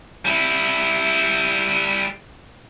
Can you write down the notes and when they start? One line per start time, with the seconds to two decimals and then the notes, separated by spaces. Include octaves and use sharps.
0.25 G3 E4